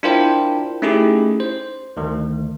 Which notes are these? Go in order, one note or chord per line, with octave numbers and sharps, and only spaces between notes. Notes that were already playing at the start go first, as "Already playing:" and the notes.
D4 E4 F4 A#4 C5 G5
A3 C#4 D#4 E4 G4 G#4
C5
D2 D#3